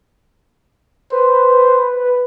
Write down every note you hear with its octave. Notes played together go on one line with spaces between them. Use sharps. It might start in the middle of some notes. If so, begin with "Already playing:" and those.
B4 C5